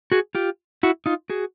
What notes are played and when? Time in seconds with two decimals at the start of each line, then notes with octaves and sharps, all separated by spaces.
0.12 F#4 G#4
0.35 F4 G4
0.83 E4 F#4
1.06 D#4 F4
1.30 F#4 G#4